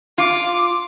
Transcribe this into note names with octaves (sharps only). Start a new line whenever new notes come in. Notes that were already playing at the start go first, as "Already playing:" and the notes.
F4 D6